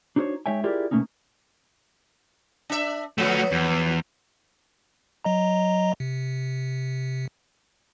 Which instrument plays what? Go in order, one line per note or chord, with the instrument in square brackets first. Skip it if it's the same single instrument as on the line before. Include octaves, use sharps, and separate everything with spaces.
[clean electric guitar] D4 D#4 F#4 A4 C5 C#5
G#3 D#4 C#5 E5 G5 G#5
E4 F4 G4 G#4 A#4 D5
B2 E3 A3 A#3 C#4 D#4
[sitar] D4 E5
[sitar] F3 F#3 B3 [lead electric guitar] A3 F#4
[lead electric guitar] E2
[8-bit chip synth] F#3 D#5 A#5
C3